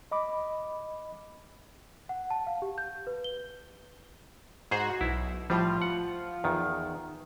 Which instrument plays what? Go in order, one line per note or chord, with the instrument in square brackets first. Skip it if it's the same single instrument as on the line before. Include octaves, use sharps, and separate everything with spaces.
[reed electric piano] D#5 B5 D6
[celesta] F#5
A5
F5
G4
G6
B4
G7
[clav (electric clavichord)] G#2 G#4 C5 [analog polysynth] F#4
[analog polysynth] B1 [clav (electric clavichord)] E4
[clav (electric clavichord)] A2 G3 [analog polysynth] F3 F4
[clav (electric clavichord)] F#5
E2 D#3